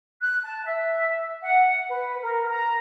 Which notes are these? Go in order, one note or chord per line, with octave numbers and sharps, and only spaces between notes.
F#6
A5
E5
F#5
B4
A#4
A#5